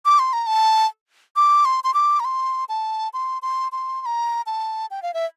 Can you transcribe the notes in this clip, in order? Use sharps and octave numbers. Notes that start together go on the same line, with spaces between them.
D6
C6
A#5
A5
D6
C6
C6
D6
A#5
C6
A5
C6
C6
C6
C6
A#5
A5
G5
F5
E5